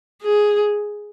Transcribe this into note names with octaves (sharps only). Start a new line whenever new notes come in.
G#4